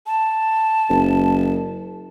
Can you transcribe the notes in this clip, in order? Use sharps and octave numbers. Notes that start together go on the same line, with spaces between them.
A5
F#1